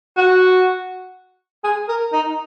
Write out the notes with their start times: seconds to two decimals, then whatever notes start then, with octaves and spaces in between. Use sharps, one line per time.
0.17 F#4
1.64 G#4
1.88 A#4
2.13 D#4